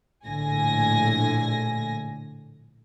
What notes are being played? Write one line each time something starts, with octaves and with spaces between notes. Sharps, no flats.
A#1 A2 D3 G#5 A#6